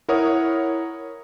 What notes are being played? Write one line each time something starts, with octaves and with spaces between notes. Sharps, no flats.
E4 A#4 C#5 F#5 D#6